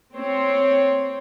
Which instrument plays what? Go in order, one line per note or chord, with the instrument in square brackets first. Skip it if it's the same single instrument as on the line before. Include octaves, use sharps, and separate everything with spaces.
[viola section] C4 C5 C#5